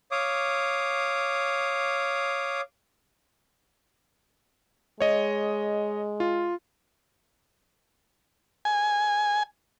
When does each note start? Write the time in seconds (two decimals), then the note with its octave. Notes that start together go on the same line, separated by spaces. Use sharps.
0.11 C#5 F5 D6 D#6
5.00 G#3 C#5 D#5
6.20 F4
8.65 G#5